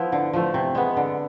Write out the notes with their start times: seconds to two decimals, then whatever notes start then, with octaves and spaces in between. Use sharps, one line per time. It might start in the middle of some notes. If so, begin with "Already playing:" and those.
Already playing: F3 B3 E4
0.12 D3
0.33 F3 A3
0.54 C3
0.75 G#3 B3
0.96 D3